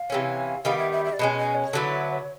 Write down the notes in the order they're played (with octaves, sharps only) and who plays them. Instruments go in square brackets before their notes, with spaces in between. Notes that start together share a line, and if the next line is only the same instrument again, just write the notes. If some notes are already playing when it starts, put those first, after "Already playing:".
Already playing: [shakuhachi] F5
[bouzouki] C3 E3 A3 C#4
[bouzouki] D#3 G3 B3 [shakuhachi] F5
[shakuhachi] E5
E5
E5
D5
[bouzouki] B2 G#3 C#4 [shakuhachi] D#5
[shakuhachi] D#5
C#5
[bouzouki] D3 F#3 B3 E4